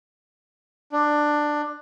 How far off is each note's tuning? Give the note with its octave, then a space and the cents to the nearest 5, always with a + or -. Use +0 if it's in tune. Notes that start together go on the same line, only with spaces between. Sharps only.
D4 +10